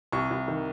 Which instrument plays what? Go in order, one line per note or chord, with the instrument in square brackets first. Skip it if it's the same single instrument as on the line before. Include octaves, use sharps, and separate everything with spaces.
[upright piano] C2 C#6
C2
D#3